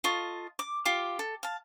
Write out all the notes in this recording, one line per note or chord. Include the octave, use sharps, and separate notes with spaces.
F4 A4 D#5 C#6
D6
F4 G4 F5 D6
A4
F5 A5